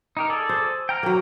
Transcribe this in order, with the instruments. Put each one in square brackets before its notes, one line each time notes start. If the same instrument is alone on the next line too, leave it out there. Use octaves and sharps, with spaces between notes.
[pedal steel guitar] D#4 G4 A#4
G#4 A4 D5
[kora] C5
[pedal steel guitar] G5 A#5 F6
[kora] F#3 A#3